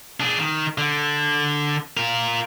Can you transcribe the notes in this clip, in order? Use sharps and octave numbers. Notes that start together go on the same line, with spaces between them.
D4 G#4
D#3
D3
F4 A#4